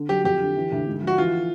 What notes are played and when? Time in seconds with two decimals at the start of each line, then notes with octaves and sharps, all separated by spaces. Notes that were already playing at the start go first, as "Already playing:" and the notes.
Already playing: D3
0.09 F#3 G4
0.24 F2 G4
0.41 D3
0.56 E3
0.72 D2
0.87 G#2
1.02 F3
1.07 F#4
1.18 E3 F4